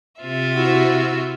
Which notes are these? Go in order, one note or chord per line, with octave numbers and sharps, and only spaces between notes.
C3 F4 E5
E4 F#4